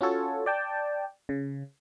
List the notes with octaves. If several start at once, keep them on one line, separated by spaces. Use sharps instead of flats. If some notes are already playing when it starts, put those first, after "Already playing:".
C#4 F4 F#4 A4 C#5
D5 G5 A5
C#3